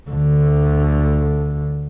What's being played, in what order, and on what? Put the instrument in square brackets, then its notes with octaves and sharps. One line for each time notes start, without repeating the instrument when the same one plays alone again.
[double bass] D2 D3